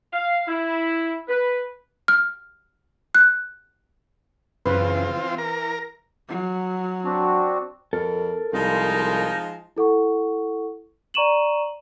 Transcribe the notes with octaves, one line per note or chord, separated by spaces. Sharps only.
F5
E4
B4
F6
F#6
F#2 C#3 E3 C4 F4 B4
E3
A#4
F#3
C4 D4 F#4
F2 A4 A#4
C2 F3 G#3 D#4 F4
E4 A4 F#5 C#6
D5 A#5 C#6 D#7 E7 F#7